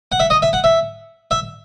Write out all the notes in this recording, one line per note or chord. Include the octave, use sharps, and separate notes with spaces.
F#5
E5
D#5
E5
F#5
E5
E5